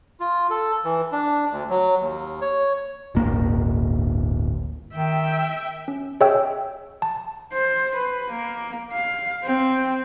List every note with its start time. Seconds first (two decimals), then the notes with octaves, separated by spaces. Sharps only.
0.20 F4
0.50 A4
0.85 E3
1.12 D4
1.52 D2
1.70 F#3
2.00 D#2
2.42 C#5
3.15 D1 G1 A#3
4.94 D#3 E5 G5
5.88 C#4
6.21 G#4 C#5 D#5 E5 G5 E6
7.02 A5
7.53 C5
7.95 B4
8.30 A#3
8.92 F5
9.44 C4